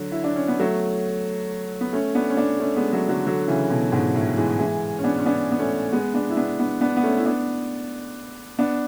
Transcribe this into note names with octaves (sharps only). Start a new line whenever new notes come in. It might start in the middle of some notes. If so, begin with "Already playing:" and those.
Already playing: D3 F#3
E4
D4
C#4
B3
F#3 A3
B3
A3 C#4
B3 D4
C#4
B3 D4
A3 C#4
G#3 B3
F#3 A3
D3 F#3
D3 F#3
C#3 E3
B2 D3
G#2 B2
A2
E3 G#3
E3 G#3
C#4
B3 D4
C#4
B3 D4
B3
A3 C#4
G#3 B3
B3 D4
E4
B3 D4
B3 D4
B3 D4
B3
A3 C#4
E4
B3 D4
B3 D4